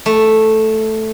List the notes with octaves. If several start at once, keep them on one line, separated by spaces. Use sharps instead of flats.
A3